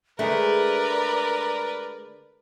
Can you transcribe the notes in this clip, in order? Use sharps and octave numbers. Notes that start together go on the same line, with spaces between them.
D3 G#3 A3 G#4 A#4 B4 D5